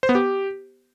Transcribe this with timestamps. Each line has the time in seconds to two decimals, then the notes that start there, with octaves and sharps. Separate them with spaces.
0.03 C5
0.09 B3
0.15 G4